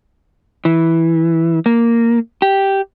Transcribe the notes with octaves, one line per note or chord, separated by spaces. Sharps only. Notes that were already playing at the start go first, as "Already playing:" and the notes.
E3
A#3
G4